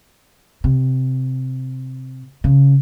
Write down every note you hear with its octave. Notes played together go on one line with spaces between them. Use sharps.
C3
C#3